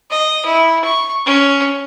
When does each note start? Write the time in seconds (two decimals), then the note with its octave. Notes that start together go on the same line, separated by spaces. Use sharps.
0.11 D#5
0.45 E4
0.84 C#6
1.25 C#4